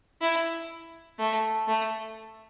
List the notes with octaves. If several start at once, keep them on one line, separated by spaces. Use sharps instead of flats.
E4
A3
A3